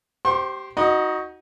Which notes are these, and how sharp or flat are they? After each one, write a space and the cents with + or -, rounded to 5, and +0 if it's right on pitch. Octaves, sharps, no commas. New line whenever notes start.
G4 -20 C5 +0 C6 +45
D#4 +25 F#4 +0 D#5 -15